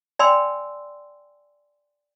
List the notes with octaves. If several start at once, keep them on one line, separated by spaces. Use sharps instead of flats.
D5 G5 G#5 B5 C6 E6